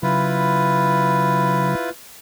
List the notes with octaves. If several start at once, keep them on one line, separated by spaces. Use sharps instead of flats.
C#3 F#3 E4 F4 B4